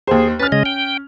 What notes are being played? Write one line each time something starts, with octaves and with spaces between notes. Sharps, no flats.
D#2 G#4 C5
C#4 B4 F6 A6
C#3 G#3 D#5
G5